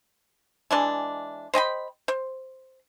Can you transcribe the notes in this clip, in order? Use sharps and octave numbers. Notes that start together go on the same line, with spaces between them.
E3 G#3 D4
C5 D#5 G5 B5
C5